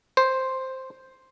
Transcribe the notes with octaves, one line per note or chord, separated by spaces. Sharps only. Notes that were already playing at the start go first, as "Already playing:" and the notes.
C5